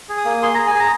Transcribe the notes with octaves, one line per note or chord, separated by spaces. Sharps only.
G#4
D#6
A#3
G#4 C6
G#4 A#5
G#5
G#4 A#5